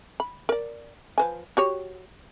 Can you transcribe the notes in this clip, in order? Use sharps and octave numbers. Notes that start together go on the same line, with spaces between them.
B5
A#4 D5
F3 B4 G#5
F#4 G4 C#5